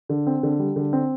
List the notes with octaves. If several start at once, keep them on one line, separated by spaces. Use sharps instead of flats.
D3
C4
D3
G3
D3
C4